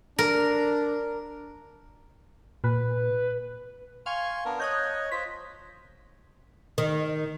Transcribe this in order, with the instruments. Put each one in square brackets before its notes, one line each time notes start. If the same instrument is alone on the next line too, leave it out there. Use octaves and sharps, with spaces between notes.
[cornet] D4 [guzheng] A#4
[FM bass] A#2 [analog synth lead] B4
[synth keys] F5 [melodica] G#5 C6 C#6
[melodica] B3 D4 A#4
[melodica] C#5 D#5 [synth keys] D#6 F#6 G6
[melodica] F4 C5 [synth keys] B6
[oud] D#3